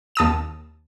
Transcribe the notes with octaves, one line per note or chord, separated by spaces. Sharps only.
D#2 A5 D#6 E7